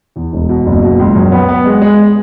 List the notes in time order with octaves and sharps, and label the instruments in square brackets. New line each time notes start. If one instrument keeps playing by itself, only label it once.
[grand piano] E2
E1
B2
F#1
B2
C#2
F#2
B3
B3
G#3
G#3